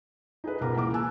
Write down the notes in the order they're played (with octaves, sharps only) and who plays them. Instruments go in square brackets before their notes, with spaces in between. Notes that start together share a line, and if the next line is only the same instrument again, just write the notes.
[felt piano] D#4 G#4 A4 B4
C#2 B2 A#4 A#5 D6
E3 A#3 D6
G#5 A5 E6 F#6